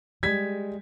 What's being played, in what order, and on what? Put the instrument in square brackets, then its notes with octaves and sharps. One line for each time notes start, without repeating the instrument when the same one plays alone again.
[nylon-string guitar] G3 G#3 [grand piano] G#6 B6